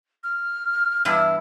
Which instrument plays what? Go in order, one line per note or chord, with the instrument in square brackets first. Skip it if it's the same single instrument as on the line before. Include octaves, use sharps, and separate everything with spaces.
[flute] F6
[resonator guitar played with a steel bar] E2 G2 E4